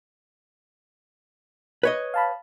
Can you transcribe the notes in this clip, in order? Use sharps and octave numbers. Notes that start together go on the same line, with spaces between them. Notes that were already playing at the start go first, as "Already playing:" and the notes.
B4 C#5 D#5
F5 A5 B5